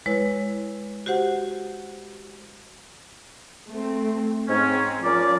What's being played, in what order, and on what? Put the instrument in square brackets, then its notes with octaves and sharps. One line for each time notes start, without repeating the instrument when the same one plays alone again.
[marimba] G#3 E4 B4 C#5
F#4 G4 C5 F#5
[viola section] A3 C4
[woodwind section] G#2 C#4 [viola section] C4
[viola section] F3 [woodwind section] C#4 A#4 D5